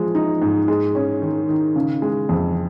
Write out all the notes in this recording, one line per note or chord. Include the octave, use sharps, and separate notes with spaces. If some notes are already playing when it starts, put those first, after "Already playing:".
Already playing: F3 G#3
D#4
G#2
G#3
C#4
D#3
D#3
C#3
G#3
F2